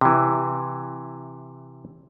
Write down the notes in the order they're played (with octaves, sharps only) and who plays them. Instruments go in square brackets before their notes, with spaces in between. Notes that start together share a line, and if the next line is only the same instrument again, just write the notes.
[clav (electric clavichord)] C3 E3